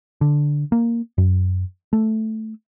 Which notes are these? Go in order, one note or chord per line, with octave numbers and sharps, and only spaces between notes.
D3
A#3
F#2
A3